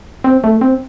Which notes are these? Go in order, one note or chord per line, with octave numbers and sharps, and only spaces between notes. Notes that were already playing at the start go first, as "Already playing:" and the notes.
C4
A3
C4